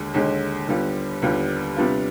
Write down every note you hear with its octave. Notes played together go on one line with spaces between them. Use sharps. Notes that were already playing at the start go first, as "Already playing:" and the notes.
Already playing: D#2 D3 G#3
D#2 D3 G#3
D#2 D3 G3 B3 F4
D#2 D3 G3 B3 F4
C3 G3 B3 D4 F4